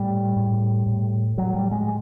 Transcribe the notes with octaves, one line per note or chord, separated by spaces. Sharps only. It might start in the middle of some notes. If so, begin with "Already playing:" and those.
Already playing: A2 G3
A2
A2
A2 F#3
G3
G#3